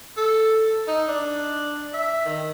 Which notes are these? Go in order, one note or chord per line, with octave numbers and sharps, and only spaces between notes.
A4
D#4
D4
E5
D#3